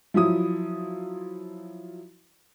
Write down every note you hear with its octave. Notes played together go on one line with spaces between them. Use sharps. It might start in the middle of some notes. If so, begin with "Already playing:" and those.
F3 F#3 E4 D#6